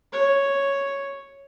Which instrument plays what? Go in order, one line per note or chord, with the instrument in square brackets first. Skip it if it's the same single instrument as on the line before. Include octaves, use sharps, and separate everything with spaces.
[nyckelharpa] C#5